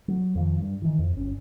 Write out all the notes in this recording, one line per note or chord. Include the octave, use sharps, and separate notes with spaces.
F#3
F2 D#3 F3
G2
D#3 E3
F2
G1 C#4